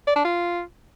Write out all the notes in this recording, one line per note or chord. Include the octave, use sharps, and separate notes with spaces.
D5
D4
F4